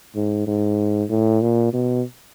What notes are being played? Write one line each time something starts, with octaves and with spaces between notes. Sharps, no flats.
G#2
G#2
A2
A#2
B2